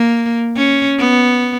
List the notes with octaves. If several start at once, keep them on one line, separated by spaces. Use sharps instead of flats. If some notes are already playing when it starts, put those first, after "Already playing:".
Already playing: A#3
C#4
B3